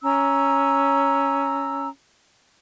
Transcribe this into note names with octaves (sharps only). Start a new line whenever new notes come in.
C#4 A#5 E6